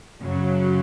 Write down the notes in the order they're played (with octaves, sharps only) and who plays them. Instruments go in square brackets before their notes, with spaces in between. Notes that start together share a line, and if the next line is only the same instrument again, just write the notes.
[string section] F#2 C#3 F#3